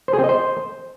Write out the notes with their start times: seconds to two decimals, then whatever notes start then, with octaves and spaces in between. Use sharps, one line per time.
0.08 C5
0.13 G#4
0.19 C4
0.24 D#5
0.29 C5